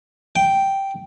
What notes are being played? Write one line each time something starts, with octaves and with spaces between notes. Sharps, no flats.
G5